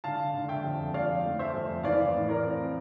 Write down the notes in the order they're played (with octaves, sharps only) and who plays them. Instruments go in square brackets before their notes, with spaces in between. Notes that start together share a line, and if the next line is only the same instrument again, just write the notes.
[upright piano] D3 F5 A5
D3
E5 G5
F2
F2 D5 F5
A3
C5 E5
F2
E3 D5 F5
A2
A#4 D5
C4